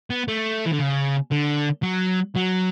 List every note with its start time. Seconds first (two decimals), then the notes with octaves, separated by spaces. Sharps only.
0.10 B3
0.28 A3
0.66 E3
0.72 D3
0.79 C#3
1.31 D3
1.83 F#3
2.36 F#3